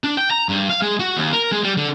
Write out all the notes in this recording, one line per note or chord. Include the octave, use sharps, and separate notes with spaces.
D4
G5
A#5
G2
F5
G#3
F#4
D#2
A#4
G#3
G3
D3